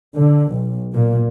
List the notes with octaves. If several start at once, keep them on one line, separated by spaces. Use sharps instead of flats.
D3
B1
A#2